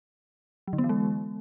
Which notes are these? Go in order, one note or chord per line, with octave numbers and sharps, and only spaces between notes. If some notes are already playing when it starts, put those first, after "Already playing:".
F#3
D3
B3
E3
G#3